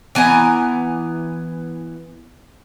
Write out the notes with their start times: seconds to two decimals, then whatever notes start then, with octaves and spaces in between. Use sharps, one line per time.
0.15 E3 B3 G#5 A#5